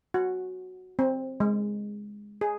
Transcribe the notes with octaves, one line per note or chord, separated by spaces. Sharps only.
F#4
C4
G#3
G#4